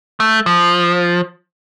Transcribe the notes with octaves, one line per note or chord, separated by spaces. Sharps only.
A3
F3